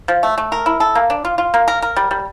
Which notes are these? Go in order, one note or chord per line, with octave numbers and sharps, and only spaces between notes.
F3
A3
A3
A#4
E4
A4
A#3
D4
F4
F4
A#3
A#4
A#4
G3
G3